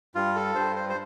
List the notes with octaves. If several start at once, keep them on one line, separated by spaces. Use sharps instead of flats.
G2 F4
A4
G2 C5
C5
C5